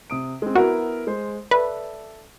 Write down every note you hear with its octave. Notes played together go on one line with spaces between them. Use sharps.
C3 D#6 D7
G#3 C4
B3 E4 F#4 A#4
G#3 C5
A4 B4 D5 E5